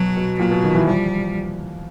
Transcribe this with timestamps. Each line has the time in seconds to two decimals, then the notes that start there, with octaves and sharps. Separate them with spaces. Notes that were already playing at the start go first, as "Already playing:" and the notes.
Already playing: B2 F#3
0.16 B2
0.39 A#2 F#3
0.50 B2
0.62 D#3
0.75 E3
0.86 F3 G3